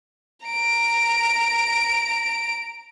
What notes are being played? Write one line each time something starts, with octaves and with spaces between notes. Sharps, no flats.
A#5 D7